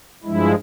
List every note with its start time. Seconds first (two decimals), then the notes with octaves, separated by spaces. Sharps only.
0.24 G2 F3 G#3 E4